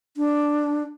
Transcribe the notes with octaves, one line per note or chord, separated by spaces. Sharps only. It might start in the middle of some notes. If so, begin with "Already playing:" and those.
D4